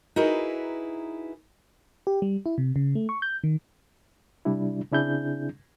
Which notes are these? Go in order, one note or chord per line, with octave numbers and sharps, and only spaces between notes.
D#4 E4 F#4 G#4 A#4 B4
G4
G3
E4
C3
C#3
A3
C#6
G6
D#3
C3 G3 D4 E4
C#3 C4 D4 E4 G#4 G6